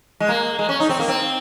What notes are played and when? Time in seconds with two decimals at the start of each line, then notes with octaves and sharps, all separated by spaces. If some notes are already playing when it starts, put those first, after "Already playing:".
0.20 G#3
0.29 A#3
0.59 G#3
0.69 C#4
0.80 D#4
0.89 C4
0.99 A#3
1.08 C4